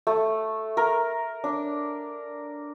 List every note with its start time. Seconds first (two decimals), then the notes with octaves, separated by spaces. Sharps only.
0.07 A3
0.77 A#4
1.44 D4